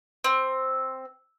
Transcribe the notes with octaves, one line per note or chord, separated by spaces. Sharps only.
C4